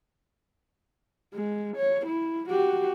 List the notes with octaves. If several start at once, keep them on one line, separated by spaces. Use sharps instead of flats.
G#3
C#5
E4
F#4 G4